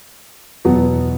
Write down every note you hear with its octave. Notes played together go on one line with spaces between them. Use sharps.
E2 B2 F#3 B3 F#4